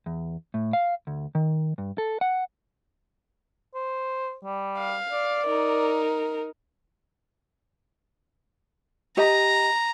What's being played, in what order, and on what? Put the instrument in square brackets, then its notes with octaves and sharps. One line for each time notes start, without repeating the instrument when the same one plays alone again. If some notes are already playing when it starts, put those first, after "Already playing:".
[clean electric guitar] E2
A2
F5
D2
D#3
G2
A4
F#5
[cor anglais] C5
G3
[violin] F5
[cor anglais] D5
[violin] D#4 A#4
[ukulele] G4 D#5 [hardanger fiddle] A#5